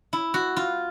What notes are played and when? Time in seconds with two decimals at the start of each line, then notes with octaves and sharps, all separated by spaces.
0.13 E4
0.34 F#4
0.56 F4